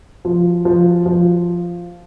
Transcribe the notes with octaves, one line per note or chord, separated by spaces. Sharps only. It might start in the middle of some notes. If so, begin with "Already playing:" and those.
F3
F3
F3